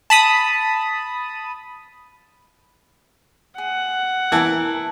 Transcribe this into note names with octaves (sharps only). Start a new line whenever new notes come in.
A5 B5 D#6
G#4 F#5
E3 A#4 A5